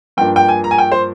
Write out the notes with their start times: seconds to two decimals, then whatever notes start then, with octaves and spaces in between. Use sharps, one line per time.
0.17 G2 F3 A#3 D4 G5
0.36 G5
0.48 G#5
0.64 A#5
0.71 G#5
0.78 G5
0.92 C5